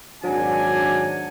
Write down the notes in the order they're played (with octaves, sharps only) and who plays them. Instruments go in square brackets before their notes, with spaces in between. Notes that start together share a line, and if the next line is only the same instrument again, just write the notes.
[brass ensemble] G#1 D4 G#5 [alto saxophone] F#3